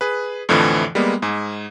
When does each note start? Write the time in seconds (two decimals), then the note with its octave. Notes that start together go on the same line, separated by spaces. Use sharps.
0.01 G#4 B4
0.49 F2 A2 D3 E3 F3
0.95 G3 G#3 A#3 B3
1.22 G#2 G#4